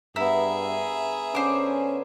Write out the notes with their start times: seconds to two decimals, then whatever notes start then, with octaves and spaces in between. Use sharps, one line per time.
0.16 G2 B3 E4 G#4 A#4 E5
1.35 D3 C#4 C5 D6